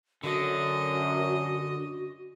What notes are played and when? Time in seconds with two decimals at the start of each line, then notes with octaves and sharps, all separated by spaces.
0.24 F#2 D3 F#4 D#5